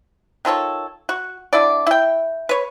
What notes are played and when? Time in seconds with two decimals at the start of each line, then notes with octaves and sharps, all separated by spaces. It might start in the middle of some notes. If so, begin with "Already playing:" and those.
0.45 D#3 F4 A4 C#5
1.09 F#4
1.53 D3 E4 D5
1.87 E4 G5
2.49 B4 C#5